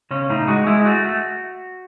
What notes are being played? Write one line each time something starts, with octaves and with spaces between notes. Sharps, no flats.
C#3 C#4
A2 D#4
G#3 F#4
G#3 E4
A3 F#4
A3